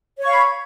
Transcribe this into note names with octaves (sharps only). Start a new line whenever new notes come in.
C#5 F5 B5 C#6